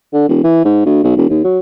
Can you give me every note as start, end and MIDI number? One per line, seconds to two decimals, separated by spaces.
0.13 0.27 50
0.28 0.40 28
0.44 0.64 52
0.65 0.84 44
0.85 1.00 38
1.04 1.15 35
1.17 1.27 28
1.29 1.43 39
1.44 1.59 54